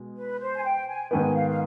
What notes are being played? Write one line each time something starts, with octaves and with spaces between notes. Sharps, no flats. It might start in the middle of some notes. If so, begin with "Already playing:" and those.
Already playing: B2 G#3
B4
C5
G#5
G5
G#5
G#2 D#3 B3 G#5
F5
F5